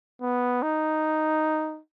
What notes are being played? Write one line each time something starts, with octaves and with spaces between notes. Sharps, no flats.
B3
D#4